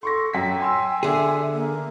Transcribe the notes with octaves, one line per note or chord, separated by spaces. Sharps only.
A4 C6 C#6 A#6
F#2 G5 B6
G#5 C6 E6
D3 G#4 E5
A#3